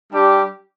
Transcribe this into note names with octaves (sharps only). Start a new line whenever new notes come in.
G3 D4 G4